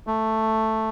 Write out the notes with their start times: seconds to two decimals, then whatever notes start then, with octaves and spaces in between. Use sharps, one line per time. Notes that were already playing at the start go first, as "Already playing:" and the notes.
0.07 A3